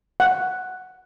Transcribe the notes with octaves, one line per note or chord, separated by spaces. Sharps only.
F#5